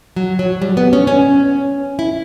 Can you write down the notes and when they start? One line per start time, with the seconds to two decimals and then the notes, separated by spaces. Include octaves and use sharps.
0.16 F#3
0.39 F#3
0.62 G3
0.77 B3
0.93 C#4
1.07 C#4
1.99 E4